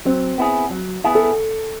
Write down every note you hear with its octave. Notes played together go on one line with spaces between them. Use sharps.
F#3 C4
B3 E4 G#4
F#3
B3 E4 G#4
A4